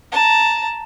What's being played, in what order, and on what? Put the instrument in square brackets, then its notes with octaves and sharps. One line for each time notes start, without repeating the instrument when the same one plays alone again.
[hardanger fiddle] A5 A#5